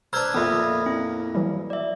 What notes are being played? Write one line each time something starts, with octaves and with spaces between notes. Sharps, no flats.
D4 B4 C5 A#5 E6 F6 G#6
F2 A#2 B3 F4 E5 B5 D#6
C4 E4
E3 F#3 G3
D5 E5